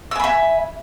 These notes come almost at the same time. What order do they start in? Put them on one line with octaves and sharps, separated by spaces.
E6 G#5 B5 E5